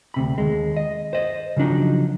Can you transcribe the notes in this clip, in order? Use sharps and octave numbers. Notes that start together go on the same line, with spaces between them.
D2 C3 B5
D#2 G#3
D#5
C5 D#5
C#3 F3 F#3 D4 D#4